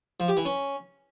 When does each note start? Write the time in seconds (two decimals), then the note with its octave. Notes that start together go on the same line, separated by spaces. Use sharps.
0.20 F3
0.28 G4
0.37 E3
0.45 C#4